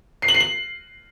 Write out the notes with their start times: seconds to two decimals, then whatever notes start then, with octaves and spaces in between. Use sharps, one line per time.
0.22 C7
0.28 F#7
0.34 C7
0.40 F#7